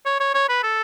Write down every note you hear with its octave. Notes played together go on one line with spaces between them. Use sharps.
C#5
C#5
C#5
B4
A4